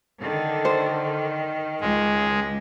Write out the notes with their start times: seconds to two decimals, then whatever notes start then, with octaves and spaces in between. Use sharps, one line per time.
0.22 D3 D#3
0.65 C5
1.80 C#2 G#3